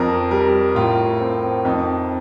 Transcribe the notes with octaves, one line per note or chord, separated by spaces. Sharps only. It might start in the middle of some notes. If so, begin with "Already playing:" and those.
Already playing: F2 A#4
G3 A#4
A2 F4
C4
F2 D#4